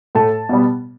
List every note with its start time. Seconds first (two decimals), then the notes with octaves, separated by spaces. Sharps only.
0.15 A2 A3 A5
0.49 B2 G3 B3